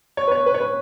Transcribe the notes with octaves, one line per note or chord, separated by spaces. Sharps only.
C#5
B4
C#5
B4
C#5
B4